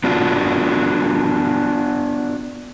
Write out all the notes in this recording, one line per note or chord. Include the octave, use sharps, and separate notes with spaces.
B3 D4 F4 F#4